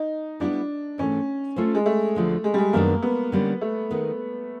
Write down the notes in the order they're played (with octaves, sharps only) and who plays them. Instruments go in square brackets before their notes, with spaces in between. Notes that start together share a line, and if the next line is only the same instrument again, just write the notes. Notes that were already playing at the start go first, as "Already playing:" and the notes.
Already playing: [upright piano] D#4
[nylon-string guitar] G3 B3 E4 G4 [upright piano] D4
[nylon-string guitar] G#2 E3 A3 [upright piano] C#4
[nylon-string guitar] A3 C#4 F4 A4 C5
[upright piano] G#3
A3
[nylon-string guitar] D2 D3 F3 G#3
[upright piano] G#3
G3
G#3
[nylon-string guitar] F#2 D#3 G#3 B3 D4 [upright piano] A#3
[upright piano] B3
[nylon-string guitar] D3 G3 A#3 C#4
[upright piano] A3
[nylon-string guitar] D#3 G#3 B3